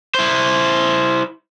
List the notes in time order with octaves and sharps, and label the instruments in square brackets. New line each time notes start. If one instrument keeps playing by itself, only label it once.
[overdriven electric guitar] E4 C5